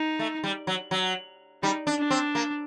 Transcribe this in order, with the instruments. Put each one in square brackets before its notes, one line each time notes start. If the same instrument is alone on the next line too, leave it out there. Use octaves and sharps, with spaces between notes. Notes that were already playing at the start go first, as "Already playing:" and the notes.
Already playing: [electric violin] D#4
[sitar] A3
G3
F#3
F#3
[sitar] G3 [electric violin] D#4
[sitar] D4
[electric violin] D4
[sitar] C4
A#3